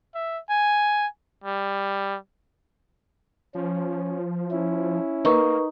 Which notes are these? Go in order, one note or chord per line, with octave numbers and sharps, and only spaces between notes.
E5
G#5
G3
F3 C#4
C#4 E4
A#3 D#4 A#4 B4 C#6